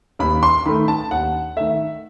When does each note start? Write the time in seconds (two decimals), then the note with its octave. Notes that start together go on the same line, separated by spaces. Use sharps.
0.19 D#2 B5
0.43 C6
0.66 D#3 A3 B5
0.88 A5
1.11 D#2 F#5
1.57 D#3 A3 E5